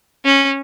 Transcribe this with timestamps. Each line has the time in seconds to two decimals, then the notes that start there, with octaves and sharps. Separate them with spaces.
0.25 C#4